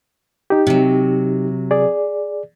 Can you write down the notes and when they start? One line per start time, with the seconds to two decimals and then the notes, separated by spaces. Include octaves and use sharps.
0.50 D#4 G4
0.67 C3 F#3
1.71 G#4 D5